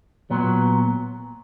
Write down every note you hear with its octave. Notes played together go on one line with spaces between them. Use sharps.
A#2 F#3 B3